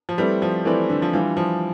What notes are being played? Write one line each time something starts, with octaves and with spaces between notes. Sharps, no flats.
F3
G3 A3 C4 E4 B4 D5
F3
E3 A3 C4 E4 B4 D5
D3
F3
E3 G3 D4 F4
F3